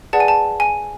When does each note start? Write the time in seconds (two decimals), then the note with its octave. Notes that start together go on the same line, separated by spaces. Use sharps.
0.13 G#4 B4 D5 F#5 A5
0.20 G#5
0.28 A5
0.60 G#5